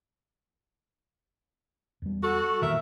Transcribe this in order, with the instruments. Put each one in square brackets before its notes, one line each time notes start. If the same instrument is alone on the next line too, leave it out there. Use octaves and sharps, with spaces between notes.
[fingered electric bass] E2 G3
[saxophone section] F#4 A4
[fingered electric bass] E2 A#2 D#3 [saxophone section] A#4 E5